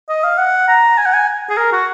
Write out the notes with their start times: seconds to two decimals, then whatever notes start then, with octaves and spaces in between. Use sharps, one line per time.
0.09 D#5
0.24 F5
0.38 F#5
0.68 A#5
0.98 G#5
1.06 F#5
1.14 G#5
1.49 G#4
1.57 A#4
1.72 F#4